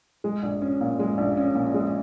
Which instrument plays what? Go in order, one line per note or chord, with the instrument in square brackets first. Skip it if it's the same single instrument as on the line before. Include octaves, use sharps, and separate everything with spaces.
[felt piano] G#3
A#1
C#4
A#2
G#3
A#1
C#4
A#2
G#3